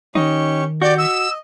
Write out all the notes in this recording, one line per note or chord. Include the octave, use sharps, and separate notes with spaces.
D#3 C#4 D#4 G4 C#6
F#4 G4 D5 D6 G6
D#5 E6